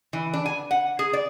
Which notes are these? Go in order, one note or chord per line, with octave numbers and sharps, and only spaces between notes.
E3
D4
G#5
F#5
G#4
D5